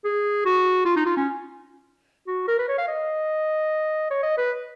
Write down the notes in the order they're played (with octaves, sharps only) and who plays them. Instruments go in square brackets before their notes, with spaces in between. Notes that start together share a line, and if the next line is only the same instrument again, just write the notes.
[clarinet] G#4
F#4
F4
D#4
F4
C#4
F#4
A#4
B4
C#5
F5
D#5
C#5
D#5
B4